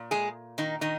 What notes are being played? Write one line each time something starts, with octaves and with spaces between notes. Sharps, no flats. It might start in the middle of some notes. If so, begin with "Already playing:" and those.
Already playing: A#2
G#3 G#4
D#3 D#4
D#3 D#4